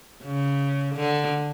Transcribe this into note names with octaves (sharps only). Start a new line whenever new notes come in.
C#3
D3